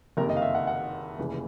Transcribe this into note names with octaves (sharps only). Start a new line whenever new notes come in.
F#1 F2 C3 D#3 A#4
D#5
F5
E5
F#5
F#5
F1 D#2 C#3 E3